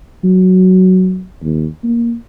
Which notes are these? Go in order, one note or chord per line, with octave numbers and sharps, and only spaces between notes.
F#3
D#2
A#3